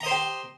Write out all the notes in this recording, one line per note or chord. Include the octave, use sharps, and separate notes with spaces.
G4 C5 D#5 A#5 C6